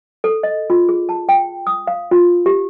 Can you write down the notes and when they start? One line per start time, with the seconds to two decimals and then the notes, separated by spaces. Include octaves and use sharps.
0.24 A4
0.43 D#5
0.70 F4
0.89 G#4
1.09 A5
1.29 G5
1.67 D#6
1.87 F5
2.11 F4
2.46 G4